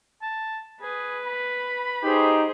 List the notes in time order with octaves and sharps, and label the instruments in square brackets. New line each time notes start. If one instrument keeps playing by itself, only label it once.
[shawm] A5
[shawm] G#4 [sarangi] B4
[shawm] B5
[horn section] D#4 G4 [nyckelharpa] G#4 C5